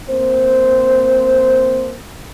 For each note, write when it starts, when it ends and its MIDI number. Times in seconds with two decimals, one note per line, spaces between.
0.10 1.97 58
0.10 1.97 60
0.10 1.97 72